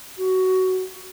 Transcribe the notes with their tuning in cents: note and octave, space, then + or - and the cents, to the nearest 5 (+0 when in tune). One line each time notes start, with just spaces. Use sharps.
F#4 +15